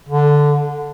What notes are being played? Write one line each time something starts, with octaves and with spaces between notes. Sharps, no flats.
D3